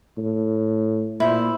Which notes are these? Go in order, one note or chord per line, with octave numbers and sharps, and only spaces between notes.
A2
A#2 E4 C5